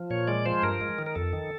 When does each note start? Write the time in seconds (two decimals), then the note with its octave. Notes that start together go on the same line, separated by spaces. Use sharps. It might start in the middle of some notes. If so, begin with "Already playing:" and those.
Already playing: F3
0.10 A#2 C#5
0.27 G#3 D5
0.46 F3 C5
0.62 G2 A#4
0.81 G#3
0.98 D#3
1.06 A#4
1.15 F2 A4
1.33 D#3